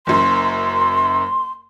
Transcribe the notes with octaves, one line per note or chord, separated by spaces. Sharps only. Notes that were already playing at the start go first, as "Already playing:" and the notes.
F#1 F#2 C6